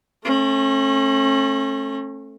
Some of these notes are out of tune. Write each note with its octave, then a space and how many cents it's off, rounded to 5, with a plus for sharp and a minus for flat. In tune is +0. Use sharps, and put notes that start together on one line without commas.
A3 +0 C#4 -40